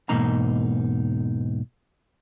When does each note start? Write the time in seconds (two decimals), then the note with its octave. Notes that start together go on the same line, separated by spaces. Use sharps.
0.09 E2 G#2 B2 A#3 D#4 A#5